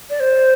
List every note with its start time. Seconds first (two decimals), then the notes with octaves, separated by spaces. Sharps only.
0.10 D5
0.20 C5